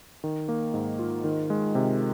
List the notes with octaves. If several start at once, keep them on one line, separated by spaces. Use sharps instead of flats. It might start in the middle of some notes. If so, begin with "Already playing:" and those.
D#3
A#3
G#2
F4
D#3
G#3
C3